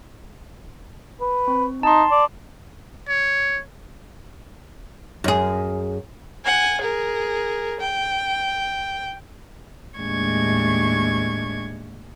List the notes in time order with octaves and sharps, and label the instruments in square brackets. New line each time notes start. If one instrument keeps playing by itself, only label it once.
[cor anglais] B4
[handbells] C4
[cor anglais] D#4 [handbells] A5 C6
[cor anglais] D5
[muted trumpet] C#5
[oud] F#2 G#4
[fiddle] F#5 G#5
G#4 A#4
G5
[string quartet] D#2 A2 G#3 D4 C#6 G#6